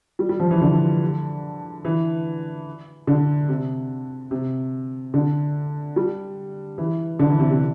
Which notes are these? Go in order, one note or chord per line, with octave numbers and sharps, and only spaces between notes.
G3
G3
F3
E3
D3
E3
D3
C3
C3
D3
G3
E3
D3
E3
C3
C3